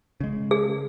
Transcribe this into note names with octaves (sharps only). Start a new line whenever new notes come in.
C#3 G#3
G#4